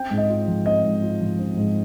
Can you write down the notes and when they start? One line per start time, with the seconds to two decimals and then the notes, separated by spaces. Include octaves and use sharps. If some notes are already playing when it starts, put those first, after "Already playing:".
Already playing: C4 G5
0.11 G#2
0.17 D#5
0.29 F4
0.48 F3
0.66 C4 D#5
0.84 G#2
1.02 F4
1.21 F3
1.39 C4
1.57 G#2